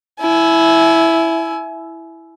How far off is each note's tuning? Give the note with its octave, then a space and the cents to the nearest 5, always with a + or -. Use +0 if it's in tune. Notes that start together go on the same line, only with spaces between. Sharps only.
E4 +0 G#5 +30